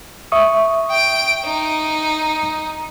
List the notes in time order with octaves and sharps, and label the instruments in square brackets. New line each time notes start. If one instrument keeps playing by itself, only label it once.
[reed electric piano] E5 C#6 D#6
[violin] G5 D7
D#4